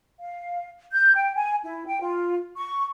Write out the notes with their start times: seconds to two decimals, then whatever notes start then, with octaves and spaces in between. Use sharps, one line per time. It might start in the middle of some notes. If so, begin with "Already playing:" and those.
0.21 F5
0.93 G6
1.16 G5
1.36 G#5
1.63 E4
1.87 G5
2.02 F4
2.56 C#6